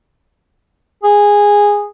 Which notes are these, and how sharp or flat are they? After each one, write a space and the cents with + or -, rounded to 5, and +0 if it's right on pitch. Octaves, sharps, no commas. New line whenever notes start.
G#4 -15